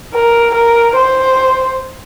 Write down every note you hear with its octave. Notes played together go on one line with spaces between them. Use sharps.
A#4
A#4
C5